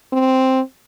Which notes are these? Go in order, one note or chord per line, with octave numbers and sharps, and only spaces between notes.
C4